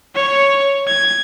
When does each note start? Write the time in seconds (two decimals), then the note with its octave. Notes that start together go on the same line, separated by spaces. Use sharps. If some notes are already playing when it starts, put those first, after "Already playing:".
0.15 C#5
0.87 G#6